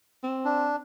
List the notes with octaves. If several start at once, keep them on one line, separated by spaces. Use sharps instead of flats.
C4
D4